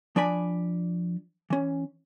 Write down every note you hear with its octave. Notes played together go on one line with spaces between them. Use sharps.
F3 D4 D5 G#5 B5
E3 C#4